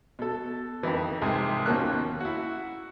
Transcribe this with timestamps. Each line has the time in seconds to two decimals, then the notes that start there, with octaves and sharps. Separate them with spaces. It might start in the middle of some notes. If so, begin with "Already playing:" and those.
0.19 B2 A4
0.83 F2 D#3 E3
1.22 C2 G#2 F3 G#5
1.66 D#2 B2 F3 A#3 C#4 F#6
2.20 E4 F#4